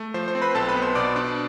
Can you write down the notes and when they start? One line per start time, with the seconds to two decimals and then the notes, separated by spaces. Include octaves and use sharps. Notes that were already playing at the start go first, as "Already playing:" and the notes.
Already playing: A3
0.14 F3 C5
0.28 C5
0.35 C4
0.41 B4 B5
0.55 B1 A4 A5
0.69 B4 B5
0.75 B3
0.82 C5 C6
0.95 B2 D5 D6
1.16 D4